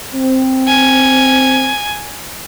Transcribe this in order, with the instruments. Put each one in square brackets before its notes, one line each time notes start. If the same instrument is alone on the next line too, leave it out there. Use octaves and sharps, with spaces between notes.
[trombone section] C4
[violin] G#5